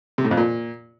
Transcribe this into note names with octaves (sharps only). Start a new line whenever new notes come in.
C3
A2
F2
A#2